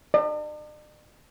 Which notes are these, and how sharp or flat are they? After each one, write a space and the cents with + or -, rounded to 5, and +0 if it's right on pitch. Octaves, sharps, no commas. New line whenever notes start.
D5 +45